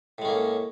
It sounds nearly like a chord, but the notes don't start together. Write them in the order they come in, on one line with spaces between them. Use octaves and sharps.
A2 G#3 C#4 A#3